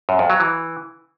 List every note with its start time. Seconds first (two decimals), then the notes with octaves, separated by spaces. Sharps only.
0.09 F#2
0.19 F2
0.30 F#3
0.40 E3